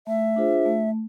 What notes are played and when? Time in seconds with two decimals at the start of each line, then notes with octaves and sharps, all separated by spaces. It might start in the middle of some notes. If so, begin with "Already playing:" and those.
0.07 A3 E5
0.36 D4 F4 G#4 C5
0.65 A3